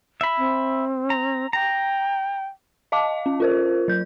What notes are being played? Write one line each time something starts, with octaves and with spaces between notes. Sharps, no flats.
E5 B5
C4
A#5
G5 A#5
D#5 F5 A5 D6
C#4
F4 A#4 C5
F#3 G6